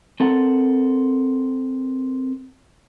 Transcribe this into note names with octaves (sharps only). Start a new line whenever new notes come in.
C4 A4 A#4 F#5